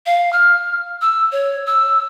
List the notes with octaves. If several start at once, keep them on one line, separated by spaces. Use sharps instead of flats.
F5
F6
E6
C#5
E6